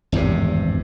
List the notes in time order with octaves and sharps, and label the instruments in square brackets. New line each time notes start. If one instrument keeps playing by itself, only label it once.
[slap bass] G#1 E2 G2 C3